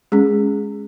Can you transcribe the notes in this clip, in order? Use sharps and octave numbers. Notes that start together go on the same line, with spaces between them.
G#3 C#4 G#4